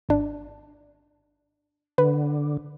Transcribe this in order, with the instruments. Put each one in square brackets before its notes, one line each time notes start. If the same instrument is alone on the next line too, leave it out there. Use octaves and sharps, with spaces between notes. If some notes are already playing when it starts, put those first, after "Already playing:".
[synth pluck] G#1 D4
[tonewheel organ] D3 [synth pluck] B4